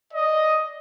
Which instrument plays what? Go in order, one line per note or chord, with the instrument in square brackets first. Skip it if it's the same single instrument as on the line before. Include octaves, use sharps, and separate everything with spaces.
[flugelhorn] D5 [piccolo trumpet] D#5